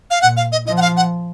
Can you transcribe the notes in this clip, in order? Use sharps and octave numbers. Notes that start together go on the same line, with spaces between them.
F5
A#2 F#5
F5
D#5
F3 D#5
F#5
F5
F#5